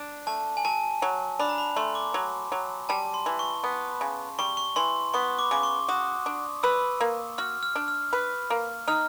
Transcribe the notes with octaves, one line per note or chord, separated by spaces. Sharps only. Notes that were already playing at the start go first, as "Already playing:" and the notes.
Already playing: D4
A3 A5
G#5
F#3 A5
F#3
D4 B5
A#5
B5
A3 C6
D6
F#3
F#3
G3 A5
C6
E3
C#6
B3
C#3
G3 C#6
C#6
E3 C6
B3 C#6
D6
C#3 D6
C#6
F#4 D#6
D4
B4 E6
A#3
F#4 F6
F6
D4
F6
B4
A#3
D#4 F6